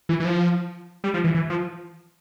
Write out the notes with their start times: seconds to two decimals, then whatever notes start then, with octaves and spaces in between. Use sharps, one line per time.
0.09 E3
0.20 E3
0.25 F3
1.04 G3
1.14 F3
1.24 E3
1.35 E3
1.50 F3